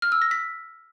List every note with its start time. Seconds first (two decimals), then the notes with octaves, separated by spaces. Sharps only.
0.02 F6
0.12 E6
0.22 A#6
0.31 B6